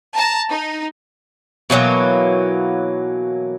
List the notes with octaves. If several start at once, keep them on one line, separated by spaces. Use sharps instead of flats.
A5 A#5
D#4
B2 E3 F#3 A#3